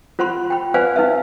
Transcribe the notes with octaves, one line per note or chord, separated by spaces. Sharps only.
F4 C5 F#5 B5 C6
G5 B5
B4 C5 D5 F5 F#5 G#5
D#4 B4 E5